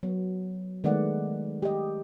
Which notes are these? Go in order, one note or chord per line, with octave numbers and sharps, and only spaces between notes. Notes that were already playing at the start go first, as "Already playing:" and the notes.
F#3 B3
D#3 G#3 A3 B3 D5 F#5
G4 D#5